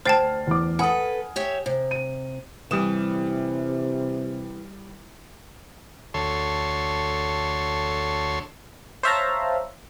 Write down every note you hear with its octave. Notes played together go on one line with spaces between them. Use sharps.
D2 C5 G5 A5 F6 A6 C7
E2 D6
A4 B4 F#5 G#5 D#6
G4 C#5 E5
C3
D#7
C3 E3 G3 D#6 E7
D2 A4 C#5 C6
C5 C#5 E5 F5 A5 A#5